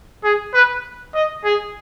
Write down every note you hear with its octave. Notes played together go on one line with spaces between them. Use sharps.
G#4
B4
D#5
G#4